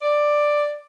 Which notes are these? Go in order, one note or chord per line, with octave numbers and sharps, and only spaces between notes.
D5